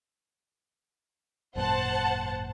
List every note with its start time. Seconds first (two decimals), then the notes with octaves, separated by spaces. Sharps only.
1.55 G#1 F#2 A#2 C5 F#5 A5